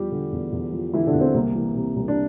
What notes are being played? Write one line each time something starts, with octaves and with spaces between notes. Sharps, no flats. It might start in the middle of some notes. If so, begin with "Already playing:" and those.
Already playing: E2 F3 G3 G4
D3
E2
E2
F3
D3 E3 E4
D3 D4
E2
C4
C2 A#3
E3
C3
C2
D4